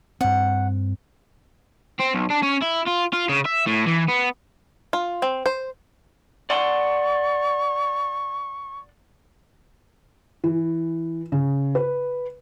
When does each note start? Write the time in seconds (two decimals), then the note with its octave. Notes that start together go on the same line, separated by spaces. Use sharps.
0.21 G2 C4 F#5
2.00 C4
2.15 B1
2.30 D4
2.43 C#4
2.62 E4
2.87 F4
3.13 F4
3.29 C#3
3.46 E5
3.67 A2
3.87 E3
4.09 B3
4.93 F4
5.22 C4
5.46 C5
6.50 D5 F#5 C6 C#6
10.44 E3
11.32 C#3
11.75 B4